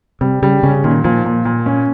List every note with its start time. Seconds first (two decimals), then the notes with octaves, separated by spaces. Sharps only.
0.21 C3 G3
0.42 C#3 G3
0.63 C#3 C#4
0.84 A#2 D#3
1.04 A#2 F3
1.24 A#2
1.45 A#2
1.66 C#4